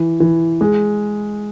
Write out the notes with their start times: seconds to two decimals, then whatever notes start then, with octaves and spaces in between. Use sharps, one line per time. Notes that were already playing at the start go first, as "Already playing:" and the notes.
Already playing: E3
0.20 E3
0.61 G#3